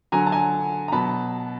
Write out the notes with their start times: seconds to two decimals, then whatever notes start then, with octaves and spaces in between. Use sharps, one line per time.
0.12 D3 F#3 G#5 A#5
0.27 A5
0.32 G#5 A#5
0.88 A#5
0.92 B2 F#3 A5 B5